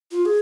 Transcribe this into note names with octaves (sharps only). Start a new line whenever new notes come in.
F4
G#4